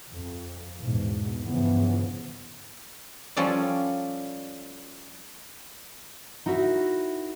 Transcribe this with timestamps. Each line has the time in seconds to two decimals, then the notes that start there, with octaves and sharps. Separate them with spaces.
0.11 F2
0.80 E2 G#2 B2
1.46 G2 C#3 E3 F3 B3
3.37 F3 G3 C#4 A4 D5
6.46 D#4 E4 F#4 A#4 E5